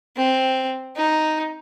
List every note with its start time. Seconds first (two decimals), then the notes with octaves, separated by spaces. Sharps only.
0.17 C4
0.96 D#4